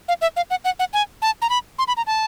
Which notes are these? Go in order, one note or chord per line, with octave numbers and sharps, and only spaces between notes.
F5
E5
F5
F#5
F#5
F#5
G#5
A5
A#5
B5
C6
B5
A#5
A5